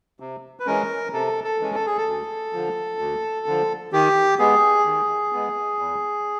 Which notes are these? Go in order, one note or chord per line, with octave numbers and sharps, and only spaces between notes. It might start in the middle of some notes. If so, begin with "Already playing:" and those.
C3
B4
E3 G#3 C#4 A#4
C3 A4
A4
E3 G#3 C#4
A4
G#4
A4
D2
D3 F3
D2
D3 F3
D#3 G4
G#3 B3 G#4
D#3
G#3 B3
E2